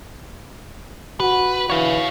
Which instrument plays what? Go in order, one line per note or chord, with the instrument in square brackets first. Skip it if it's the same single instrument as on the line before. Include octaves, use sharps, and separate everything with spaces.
[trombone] F#4 [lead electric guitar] B4
[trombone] E3 [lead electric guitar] C#5 F5